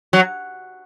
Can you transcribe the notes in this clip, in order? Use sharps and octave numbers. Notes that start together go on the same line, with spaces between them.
F#3